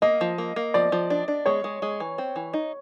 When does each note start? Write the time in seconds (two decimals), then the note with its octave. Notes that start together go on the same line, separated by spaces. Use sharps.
0.02 A#3 D#5
0.21 F3
0.38 A#3
0.56 A#3
0.74 F3 D5
0.92 F3
1.10 D4
1.28 D4
1.46 G#3 C#5
1.64 G#3
1.82 G#3
2.00 E3
2.18 C4
2.36 E3
2.54 D#4